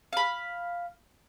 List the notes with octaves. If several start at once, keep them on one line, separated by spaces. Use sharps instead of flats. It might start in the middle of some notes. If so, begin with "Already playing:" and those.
F5 B5